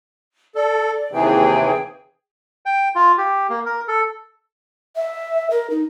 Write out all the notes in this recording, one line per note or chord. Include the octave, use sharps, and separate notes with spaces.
A4 D5
D#2 C3 E3 G#4 G5
G5
F4
G4
A#3
A#4
A4
E5
A#4
D#4